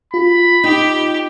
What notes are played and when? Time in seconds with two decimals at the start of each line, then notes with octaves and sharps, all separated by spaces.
0.14 F4 B5
0.64 D#4 G4